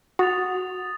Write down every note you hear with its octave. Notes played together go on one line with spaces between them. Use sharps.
F#4 D#6 A6 F7